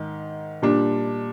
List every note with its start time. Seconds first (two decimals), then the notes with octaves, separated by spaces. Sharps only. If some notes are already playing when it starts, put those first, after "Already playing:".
Already playing: G#2 D#3
0.62 A#2 G3 D4